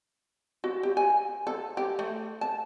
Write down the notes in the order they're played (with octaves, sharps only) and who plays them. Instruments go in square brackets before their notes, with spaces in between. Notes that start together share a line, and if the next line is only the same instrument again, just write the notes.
[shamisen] F#4
G4
G#5
A4
G4
A3
A5